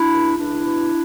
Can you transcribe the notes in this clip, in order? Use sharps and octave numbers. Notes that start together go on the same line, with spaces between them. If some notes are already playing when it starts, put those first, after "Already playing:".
Already playing: D4 E4
C#2
C#2 D4 E4
B2